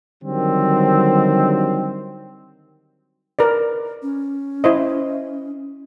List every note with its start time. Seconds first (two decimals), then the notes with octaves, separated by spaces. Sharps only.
0.23 D3 D#3 F#3 G3 C4
3.39 A#4 B4 D5
4.02 C#4
4.64 E4 C5 D#5